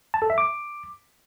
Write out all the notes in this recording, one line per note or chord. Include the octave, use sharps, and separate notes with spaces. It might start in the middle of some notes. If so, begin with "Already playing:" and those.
A5
A4
E5
D6